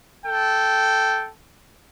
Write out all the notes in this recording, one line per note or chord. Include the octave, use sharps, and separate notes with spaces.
A4 G5